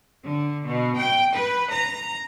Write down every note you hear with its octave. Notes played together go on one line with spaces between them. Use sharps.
D3
B2
G5
B4
A#5